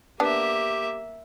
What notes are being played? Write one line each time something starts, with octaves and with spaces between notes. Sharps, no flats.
A#3 B3 D4 G4 E5